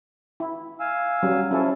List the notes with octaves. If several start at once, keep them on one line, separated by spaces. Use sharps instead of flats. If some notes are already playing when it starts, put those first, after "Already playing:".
E4
F5 G#5 E6
F#3 G3 C#4
F3 C#4 E4 A4